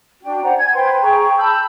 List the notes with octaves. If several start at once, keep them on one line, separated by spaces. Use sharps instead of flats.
D4 F#4 G5
C5 D5 F#5 A#5
G#5 G#6
B4 C5 G5 C6
G#4 G5 A#5 C#6
A5 B5 E6 G6